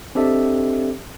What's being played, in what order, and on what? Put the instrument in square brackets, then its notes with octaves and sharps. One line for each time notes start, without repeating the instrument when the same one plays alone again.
[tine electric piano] C4 D4 G4 A4 D#5 E5